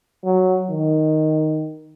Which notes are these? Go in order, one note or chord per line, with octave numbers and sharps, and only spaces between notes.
F#3
D#3